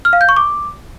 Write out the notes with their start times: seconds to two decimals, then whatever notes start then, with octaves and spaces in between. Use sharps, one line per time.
0.05 F6
0.13 F5
0.21 G6
0.29 C#6
0.36 D6